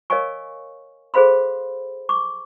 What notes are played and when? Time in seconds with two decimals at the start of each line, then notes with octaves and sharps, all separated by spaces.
0.10 A#4 C#5 D#5 F5 G#5 C#6
1.14 G#4 A4 C5 F5 B5 C6
2.09 C#6 D6